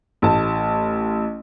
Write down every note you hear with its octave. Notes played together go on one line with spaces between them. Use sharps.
A1 A5